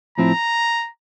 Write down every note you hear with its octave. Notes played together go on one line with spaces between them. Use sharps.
A2 F3 C4 E4 A#5